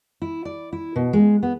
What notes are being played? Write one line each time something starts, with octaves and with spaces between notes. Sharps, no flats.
E4
D5
E4
B2
G#3
B3